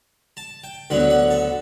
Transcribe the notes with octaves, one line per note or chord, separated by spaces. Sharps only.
A5
G5
D2 D3 F#3 B3 F#5
F#5
A4